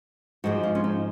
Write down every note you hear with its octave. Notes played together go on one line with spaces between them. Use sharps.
G#2 F3 G#3 F#4
F4
C#4
D#4